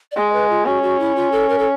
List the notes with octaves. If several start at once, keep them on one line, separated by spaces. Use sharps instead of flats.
D5
G#3 D#5
B4
F4
C#4 F#4
F#4
E4
F4
A4
A#4
A4